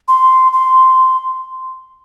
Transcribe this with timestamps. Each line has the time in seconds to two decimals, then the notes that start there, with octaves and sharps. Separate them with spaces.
0.08 C6
0.53 C6